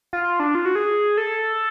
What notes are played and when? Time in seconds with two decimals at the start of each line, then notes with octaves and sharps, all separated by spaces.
0.13 F4
0.24 F4
0.40 D4
0.55 F4
0.65 F#4
0.75 G#4
1.18 A4